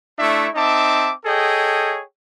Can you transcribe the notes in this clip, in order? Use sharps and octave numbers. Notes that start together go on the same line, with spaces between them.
A3 D4 E4 E5 C#6
C4 D#4 E5 A5 D6
G#4 A4 C#5 D#5 G5